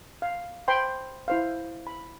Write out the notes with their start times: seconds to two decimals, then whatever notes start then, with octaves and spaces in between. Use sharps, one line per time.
0.22 F5
0.68 C5 G5 B5 C6
1.28 E4 C5 F5
1.87 B5